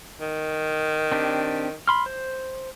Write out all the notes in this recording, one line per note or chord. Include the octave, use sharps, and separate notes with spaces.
D#3
C4 D4 G4
B5 C6 F6
C5